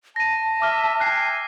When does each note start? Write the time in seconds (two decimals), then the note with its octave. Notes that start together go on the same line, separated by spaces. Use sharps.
0.16 A5 A#6 D#7
0.62 E5 D6 F6
1.00 E5 G5 G#5 F#6 C7